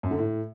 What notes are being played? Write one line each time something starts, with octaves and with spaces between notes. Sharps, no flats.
F#2
D3
A2